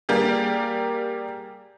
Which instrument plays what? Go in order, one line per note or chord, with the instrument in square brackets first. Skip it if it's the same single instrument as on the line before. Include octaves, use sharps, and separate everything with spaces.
[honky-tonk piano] G3 A#3 G4 G#4